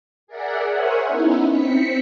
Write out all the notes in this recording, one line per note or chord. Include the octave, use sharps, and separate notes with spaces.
G#4 A#4 D5 E5 F#5
A#4 C5 C#5 E5 F#5 G#5
B3 C#4 D#4 E4
C4 B6 C#7